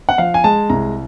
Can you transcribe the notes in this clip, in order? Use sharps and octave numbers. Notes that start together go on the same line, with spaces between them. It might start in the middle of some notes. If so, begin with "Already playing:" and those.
F#5
F3 F5
G#5
G#3 A5
C2 A#5